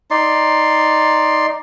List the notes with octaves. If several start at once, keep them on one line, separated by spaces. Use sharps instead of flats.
D#4 D5 C6